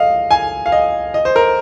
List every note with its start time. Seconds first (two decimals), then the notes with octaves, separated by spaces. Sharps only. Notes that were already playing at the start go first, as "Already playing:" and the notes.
Already playing: D#5 F5
0.31 G#5
0.66 F5
0.72 D#5
1.14 D#5
1.25 C5
1.36 A#4